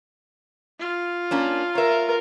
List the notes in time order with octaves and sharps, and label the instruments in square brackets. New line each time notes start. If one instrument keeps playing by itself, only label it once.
[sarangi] F4
[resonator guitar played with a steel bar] A#3 C#4 D4
[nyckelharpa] A#4 [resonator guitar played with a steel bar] C#5 E5